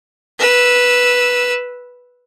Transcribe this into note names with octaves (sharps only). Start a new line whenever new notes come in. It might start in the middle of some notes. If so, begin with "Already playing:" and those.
B4 E6